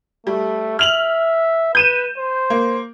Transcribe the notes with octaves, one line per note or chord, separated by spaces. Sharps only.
G3 A3
E5 F6 F7 F#7
B4 G6 D#7 E7
C5
A#3